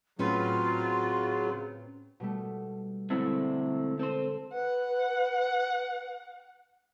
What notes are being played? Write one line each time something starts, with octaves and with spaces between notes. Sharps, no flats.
A2 C#3 F#3 C4 C#4 F4 B4
B2 G3 A3
D3 G#3 A3 B3 C4 E4
C4 A4 C5 D#7
B4 F#5